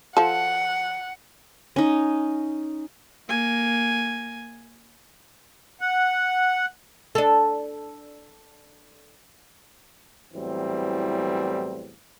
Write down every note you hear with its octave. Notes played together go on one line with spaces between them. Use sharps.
F3 A4 F#5
C#4 D#4
A#3 G#5
F#5
D4 A4
E2 A2 E3 F#3 G3 C4